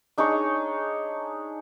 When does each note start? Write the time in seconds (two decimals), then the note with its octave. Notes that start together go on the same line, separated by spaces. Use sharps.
0.18 D4 D#4 G#4 C#5